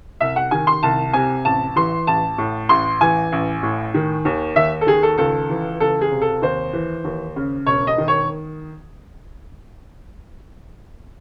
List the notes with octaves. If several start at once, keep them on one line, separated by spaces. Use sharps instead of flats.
C2 E5
F#5
D#3 G#5
C6
C2 A5
C3 G#5
A1 A5
E3 C6
A1 A5
A2
A1 C6
E3 G#5
A1
A2
D#3
D#2
D#2 E5
A4
D#3 G#4
A4
C#2 A4
E3
C#2 A4
G#4
C3
A4
D#2 C5
E3
D#2
C#3
E1 C#5
D#5
D#3
C#5